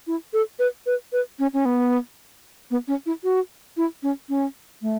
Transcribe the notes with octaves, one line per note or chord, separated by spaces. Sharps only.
E4
A4
B4
B4
B4
C#4
C#4
B3
B3
C#4
E4
F#4
E4
C#4
C#4
A3